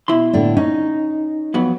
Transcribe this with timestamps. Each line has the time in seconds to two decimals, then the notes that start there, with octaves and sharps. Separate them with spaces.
0.08 B2 E4 C6
0.33 A2 D3 D4
0.57 C#4 D#4
1.54 F2 F#3 B3